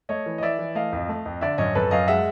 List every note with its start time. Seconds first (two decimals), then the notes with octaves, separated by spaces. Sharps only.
0.09 A3 C#5 D#5
0.26 E3
0.38 D#5
0.42 E3 D5 E5
0.59 E3
0.75 A3 D#5 F5
0.92 F2
1.09 A3
1.26 F2
1.41 D3 D5 E5
1.58 F#2 C#5 D#5
1.75 F#2 A4 B4
1.91 F#2 D#5 F5
2.08 G#3 E5 F#5